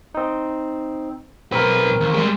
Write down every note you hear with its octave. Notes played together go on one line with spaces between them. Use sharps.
C4 D#4
B1 C4 A#4 B4
D#2
G3 G#3